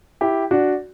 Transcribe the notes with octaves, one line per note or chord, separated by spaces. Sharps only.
E4 G4
D4 F#4